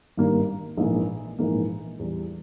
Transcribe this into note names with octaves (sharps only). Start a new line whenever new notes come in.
G#1 G2 G3 A#3
A#1 G#2 E3 A#3
A#1 G#2 E3 A#3
E2 E3 G3